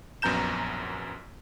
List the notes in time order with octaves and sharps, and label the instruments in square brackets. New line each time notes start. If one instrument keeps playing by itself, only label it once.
[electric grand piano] A#1 F#2 B3 A#5 G6 E7